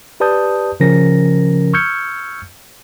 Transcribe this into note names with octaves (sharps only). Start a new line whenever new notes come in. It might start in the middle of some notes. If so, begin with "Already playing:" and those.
G4 B4 D5 A5 D#6 G6
C#3 F3 C#4 A#4 A#6
C#6 E6 F6 G6 G#6 C#7